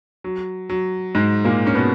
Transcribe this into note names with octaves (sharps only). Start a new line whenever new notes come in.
F#3
F#3
G#2 G#3
A#2 A#3
C#4
B2 B3